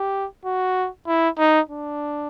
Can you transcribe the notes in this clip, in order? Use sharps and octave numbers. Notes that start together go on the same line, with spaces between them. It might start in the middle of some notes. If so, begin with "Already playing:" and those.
Already playing: G4
F#4
E4
D#4
D4